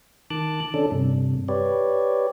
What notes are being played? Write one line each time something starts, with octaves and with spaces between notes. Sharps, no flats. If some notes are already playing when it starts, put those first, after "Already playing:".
D#3 A5 D6 F#6
D3 C#4 D4 A4
G2 C3
G4 B4 C#5 D5